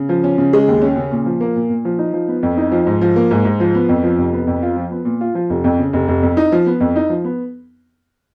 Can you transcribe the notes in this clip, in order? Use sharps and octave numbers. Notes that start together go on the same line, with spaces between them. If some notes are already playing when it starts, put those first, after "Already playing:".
Already playing: C#3
F3
C#4
C#3
G#3
D#2
C#4
C#3
A#2
F3
A#3
A#2
A#2
F3
D#4
F3
B3
F2
D#4
F3
G#2
F3
A#3
G#2
G#2
F3
B3
F2
F3
F1
B3
F2
F4
F3
B3
A#2
F4
F3
F1
F2
C#3
F1
F1
F2
D#4
F3
B3
F2
D#4
F3
B3